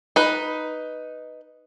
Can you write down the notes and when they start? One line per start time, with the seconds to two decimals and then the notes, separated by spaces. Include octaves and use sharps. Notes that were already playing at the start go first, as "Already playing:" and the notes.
0.16 D#4 B4